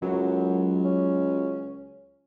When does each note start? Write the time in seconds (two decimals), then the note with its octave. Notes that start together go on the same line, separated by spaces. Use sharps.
0.02 C#2 F#2 F#3
0.85 C#4